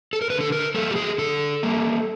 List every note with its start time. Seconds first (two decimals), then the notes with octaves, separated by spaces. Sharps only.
0.13 A4
0.22 A#4
0.30 D3 B4
0.41 A4
0.52 A#4
0.74 G3 A#3 A4
0.91 G4
0.96 G#4
1.18 D3 A4
1.63 G3 A#3